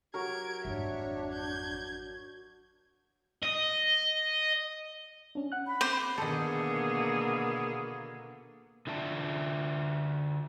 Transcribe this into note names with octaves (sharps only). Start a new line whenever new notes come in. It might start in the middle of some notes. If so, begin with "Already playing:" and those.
F#3 G4 A#4 G#6 D7
G#1 F2 D4 C#5 E5
G6 G#6
D#5
C#4 D4
F#5 F#6
B5
C4 C5 D6
B2 D3 D#3 A#3 B3 G#4 A4
D3 F4 D5 E5 G5 A5